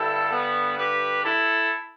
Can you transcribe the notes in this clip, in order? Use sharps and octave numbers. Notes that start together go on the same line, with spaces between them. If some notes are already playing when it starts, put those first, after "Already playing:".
Already playing: G2 D3 E4 A4
B3
G4 B4
E4 A4